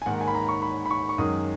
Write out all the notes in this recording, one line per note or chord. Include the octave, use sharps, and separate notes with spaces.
G#5
G#2 D#3 A#3 F#5
G#5
B5
A#5
C#6
B5
B5
C#6
C#6
F#2 D#3 G#3 D#6